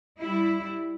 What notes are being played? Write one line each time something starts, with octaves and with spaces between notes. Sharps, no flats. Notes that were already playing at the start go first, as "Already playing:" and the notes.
G3 E4